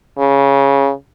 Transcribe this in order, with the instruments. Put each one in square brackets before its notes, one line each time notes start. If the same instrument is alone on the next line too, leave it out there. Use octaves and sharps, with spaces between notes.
[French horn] C#3